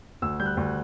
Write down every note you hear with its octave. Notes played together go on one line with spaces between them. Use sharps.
D2 E6
G3 G6
F#6
D2